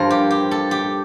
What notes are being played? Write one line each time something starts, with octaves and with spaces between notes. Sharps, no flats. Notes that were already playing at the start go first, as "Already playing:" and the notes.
Already playing: G2 F3 A#4 C5
G4
G4
A4
G4